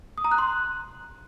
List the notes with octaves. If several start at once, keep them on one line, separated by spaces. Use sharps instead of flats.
D#6
A#5
F#6
C6